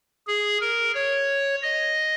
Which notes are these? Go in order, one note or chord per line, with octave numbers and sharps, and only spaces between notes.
G#4
A#4
C#5
D#5